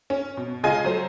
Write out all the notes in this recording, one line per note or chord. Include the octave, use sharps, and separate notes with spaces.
C#4
B2
C#3 G#3 F4 D#5 G#5
F#3 A3 C5